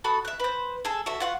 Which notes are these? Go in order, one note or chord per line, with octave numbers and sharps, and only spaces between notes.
F#4 A4 B5 D#6
E5 F#6
B4 C5
G#4 A4
F#4 A4 E5
F4 F#5 C#6